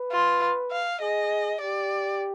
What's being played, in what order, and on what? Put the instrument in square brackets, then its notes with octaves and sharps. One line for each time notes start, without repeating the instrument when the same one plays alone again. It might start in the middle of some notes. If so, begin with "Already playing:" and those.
Already playing: [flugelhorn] B4
[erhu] F4
F5
[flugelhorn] G#4 [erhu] D#5
[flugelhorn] G4 [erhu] D5